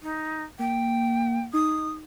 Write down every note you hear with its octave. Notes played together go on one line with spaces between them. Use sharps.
D#4
A#3 G5
D#4 D#6